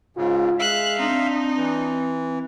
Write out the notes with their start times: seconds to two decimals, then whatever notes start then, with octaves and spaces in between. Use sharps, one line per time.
0.17 G#2 C#3 F4
0.59 G#3 E5 F5 F#6
0.99 C4 D4 D#4
1.57 E3